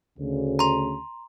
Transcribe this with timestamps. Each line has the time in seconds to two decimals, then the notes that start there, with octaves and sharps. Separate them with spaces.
0.19 D2 C#3
0.59 A#5 C6